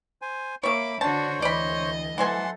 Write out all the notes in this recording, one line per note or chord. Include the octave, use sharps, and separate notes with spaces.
C5 G#5
A#3 C#5 E5 B5 D6
D3 D4 F#4 C5 C#5 A5
D2 E3 D5 D#5 B5
E3 F#3 A3 C5 F#5 G#5 C6